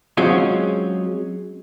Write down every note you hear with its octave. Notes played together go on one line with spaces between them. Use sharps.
F#3 G#3 C4 C#4 F4